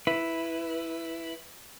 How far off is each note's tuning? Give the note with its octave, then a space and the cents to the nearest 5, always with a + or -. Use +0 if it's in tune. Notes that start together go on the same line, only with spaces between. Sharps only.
E4 +0 B4 +0